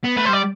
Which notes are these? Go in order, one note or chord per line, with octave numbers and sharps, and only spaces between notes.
B3
A3 B4
C5
G3 D5